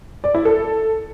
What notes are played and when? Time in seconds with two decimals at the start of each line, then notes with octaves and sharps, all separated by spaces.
0.24 D5
0.35 E4
0.45 A4